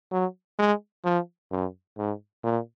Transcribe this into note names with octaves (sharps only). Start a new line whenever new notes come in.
F#3
G#3
F3
F#2
G#2
A#2